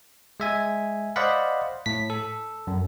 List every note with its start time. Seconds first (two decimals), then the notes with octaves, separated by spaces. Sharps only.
0.40 G#3 E5 G#5
1.16 C5 D5 D#5 F5 F#5 B5
1.86 A2 B6
2.10 A4
2.67 F#2